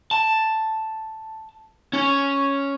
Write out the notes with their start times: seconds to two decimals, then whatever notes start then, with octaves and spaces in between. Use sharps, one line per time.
0.11 A5
1.93 C#4